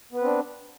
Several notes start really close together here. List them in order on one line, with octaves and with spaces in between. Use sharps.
B3 B4 C4 D4